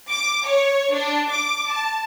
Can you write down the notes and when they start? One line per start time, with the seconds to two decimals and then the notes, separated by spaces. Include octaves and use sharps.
0.10 D6
0.47 C#5
0.94 D4
1.30 D6
1.70 A5